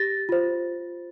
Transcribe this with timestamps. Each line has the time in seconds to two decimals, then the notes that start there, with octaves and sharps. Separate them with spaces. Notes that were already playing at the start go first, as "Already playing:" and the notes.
Already playing: G4 A6 A#6
0.29 F4 C5